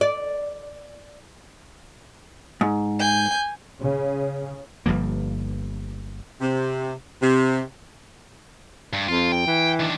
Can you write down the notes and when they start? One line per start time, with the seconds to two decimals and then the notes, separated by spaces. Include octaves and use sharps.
0.01 D5
2.61 G#2
2.99 G#5 G6
3.80 C#3
4.86 G1 G2 F3 A#3
6.41 C3
7.22 C3
8.93 G2
9.08 F2 F4
9.32 G5
9.47 E3
9.80 D#3 D4